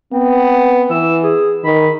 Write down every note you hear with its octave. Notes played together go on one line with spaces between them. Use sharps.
B3 C4
E3 E6
G#4
D#3 B5